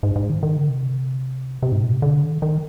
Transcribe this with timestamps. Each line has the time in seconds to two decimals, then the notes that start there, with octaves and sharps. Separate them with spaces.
0.03 G#2
0.16 G#2
0.29 D#3
0.43 D#3
0.56 D3
0.69 C3
1.62 C3
1.72 G#2
1.83 A#2
1.92 C3
2.02 D3
2.23 D#3
2.42 D#3